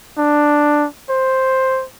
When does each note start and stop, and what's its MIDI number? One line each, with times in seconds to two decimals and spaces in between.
0.17 0.86 62
1.09 1.85 72